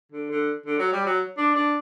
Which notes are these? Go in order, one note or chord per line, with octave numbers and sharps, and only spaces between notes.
D3
D3
D3
F#3
G3
F#3
D4
D4